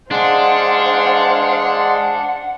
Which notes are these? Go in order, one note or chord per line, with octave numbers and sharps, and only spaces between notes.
G#3 D4 G#4 C5 F5 F#5 C6